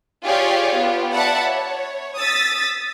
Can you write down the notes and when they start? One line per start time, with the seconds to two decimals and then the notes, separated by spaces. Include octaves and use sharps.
0.24 F4 G4 G#4 C#5 D5 F5
0.75 B3 F4 G4
1.14 D5 E5 F#5 A5 B5
1.47 C#5
2.17 D#6 E6 A6 B6